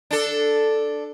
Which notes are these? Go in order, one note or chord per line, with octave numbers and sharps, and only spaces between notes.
D4 A4